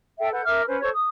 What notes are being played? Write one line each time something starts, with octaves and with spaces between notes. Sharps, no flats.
A4 E5 G5
A4 B4 F#5 G6
A#4 E5 D6 F6
C#4 B4 C5
A4 C5 C#5 C#6
D#6